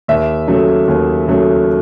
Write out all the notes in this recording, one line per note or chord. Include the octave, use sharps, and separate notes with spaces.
D#2 E5
C#3 F#3 A3
D#2
C#3 F#3 A3